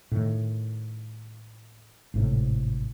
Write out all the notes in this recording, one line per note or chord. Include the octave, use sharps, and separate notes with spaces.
A2 D#3
G#1 A2 C3